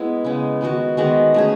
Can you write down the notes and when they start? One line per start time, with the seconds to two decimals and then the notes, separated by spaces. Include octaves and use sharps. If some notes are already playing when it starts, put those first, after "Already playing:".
Already playing: G#3 B3 E4
0.25 C#3 G#3 B3
0.61 D#3 G#3 B3 F#4
0.97 D#3 G#3 B3 F#4
1.34 A3 C#4 G#4